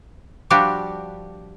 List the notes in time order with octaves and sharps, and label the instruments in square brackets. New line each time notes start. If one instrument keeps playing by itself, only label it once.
[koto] F3 G3 D4 F#4 G4